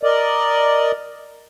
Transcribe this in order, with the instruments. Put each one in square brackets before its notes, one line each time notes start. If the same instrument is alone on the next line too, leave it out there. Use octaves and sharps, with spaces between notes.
[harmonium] A#4 D5 D#5